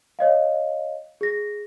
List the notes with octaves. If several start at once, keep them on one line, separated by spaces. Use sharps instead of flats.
C#5 D#5 F5
G#4 A#6